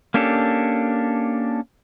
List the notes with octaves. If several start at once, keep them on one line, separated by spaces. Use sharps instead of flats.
A#3 C#4 D4 G4 A4